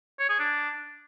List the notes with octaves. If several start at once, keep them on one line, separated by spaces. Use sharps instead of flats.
C#5
G#4
D4